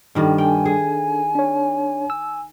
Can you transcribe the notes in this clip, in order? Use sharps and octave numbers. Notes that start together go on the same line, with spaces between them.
G2 D#3 G3 D4 A4
G5 G#5
G#4
D4 C#5
E6